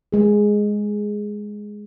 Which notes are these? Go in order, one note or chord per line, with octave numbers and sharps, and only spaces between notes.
G#3 G#4